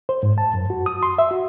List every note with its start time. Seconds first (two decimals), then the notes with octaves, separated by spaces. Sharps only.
0.09 C5
0.23 G#2
0.38 A5
0.54 F#2
0.70 F#4
0.86 D#6
1.03 C6
1.18 E5
1.31 F#4